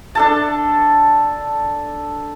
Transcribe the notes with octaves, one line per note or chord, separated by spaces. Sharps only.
D4 A4 A5